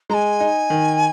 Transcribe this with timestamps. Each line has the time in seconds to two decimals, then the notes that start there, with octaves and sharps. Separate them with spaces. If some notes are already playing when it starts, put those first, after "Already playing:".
0.09 G#3 G#5 A#5
0.40 D#4
0.70 D#3